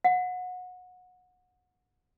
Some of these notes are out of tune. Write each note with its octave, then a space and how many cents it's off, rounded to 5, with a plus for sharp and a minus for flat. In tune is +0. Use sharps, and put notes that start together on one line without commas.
F#5 -25